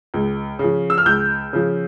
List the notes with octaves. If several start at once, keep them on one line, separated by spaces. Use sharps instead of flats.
C#2
C#3 F3
E6
F6
C#2 G6
C#3 F3